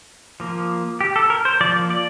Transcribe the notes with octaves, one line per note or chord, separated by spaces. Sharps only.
F3 A#3
G4
A4
A#4
C5
F3 A#3 D5
D5